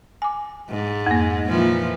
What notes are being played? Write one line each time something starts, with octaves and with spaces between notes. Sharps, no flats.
G#5 D6
G#2
F2 A#3
A#2 E3 F3